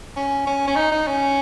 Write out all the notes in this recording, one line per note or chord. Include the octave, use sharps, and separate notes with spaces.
C#4
C#4
C#4
D#4
D#4
C#4